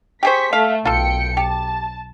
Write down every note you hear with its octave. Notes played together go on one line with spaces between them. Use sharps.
G4 G#4 C5 C#6 B6
A3 F5
B1 F4 A4 G5 C#7
G4 A5